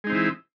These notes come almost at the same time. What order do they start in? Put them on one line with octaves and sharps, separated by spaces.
G#3 D#4 C4 E3 E4